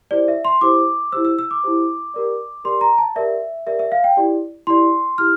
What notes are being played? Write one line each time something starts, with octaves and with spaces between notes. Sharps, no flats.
E4 G4 C5 D5
E5
C6
E4 G4 C5 D6
E4 G4 C5 E6
E6
E6
D6
E4 G4 C5
G4 A#4 D5
G4 A#4 D5 C6
A#5
A5
G4 A#4 D5 E5
G4 A#4 D5 E5
E5
F5
G5
E4 G4 D5
E4 G4 D5 C6
E4 G4 F6